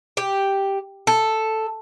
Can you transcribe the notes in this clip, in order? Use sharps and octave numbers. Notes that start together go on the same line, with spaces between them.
G4
A4